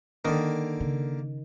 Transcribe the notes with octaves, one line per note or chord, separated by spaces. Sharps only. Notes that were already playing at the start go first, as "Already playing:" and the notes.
D3 D#3 A#3
C#3